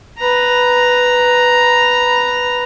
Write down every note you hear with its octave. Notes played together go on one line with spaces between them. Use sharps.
B4 A#5